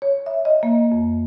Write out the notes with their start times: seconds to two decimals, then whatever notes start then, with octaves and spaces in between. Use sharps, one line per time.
0.02 C#5
0.26 E5
0.45 D#5
0.63 A#3
0.92 F2